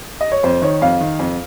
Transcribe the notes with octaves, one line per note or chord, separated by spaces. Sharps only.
D#5
C#5
F2 C5
D#3 C#5
F2 F5
D#3
F2